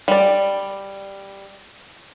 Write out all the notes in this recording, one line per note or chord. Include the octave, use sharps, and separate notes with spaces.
G3 D5